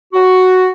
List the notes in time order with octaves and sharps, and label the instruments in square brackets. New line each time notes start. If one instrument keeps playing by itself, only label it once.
[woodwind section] F#4